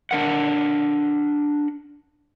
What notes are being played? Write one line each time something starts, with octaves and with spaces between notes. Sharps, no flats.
D4 A#4 F#5